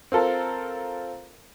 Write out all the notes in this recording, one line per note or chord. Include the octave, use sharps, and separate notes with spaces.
C4 F4 A4 A#4